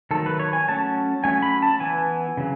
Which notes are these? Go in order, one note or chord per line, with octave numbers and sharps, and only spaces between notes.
D#3 F#3 A3 A4
B4
C#5
G#5
F#3 A3 C#4 A5
F#3 A3 C#4 G#5
B5
A5
E3 B3 G#5
C#3 F#3